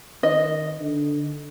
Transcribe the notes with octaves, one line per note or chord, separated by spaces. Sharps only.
D#3 D#5
D3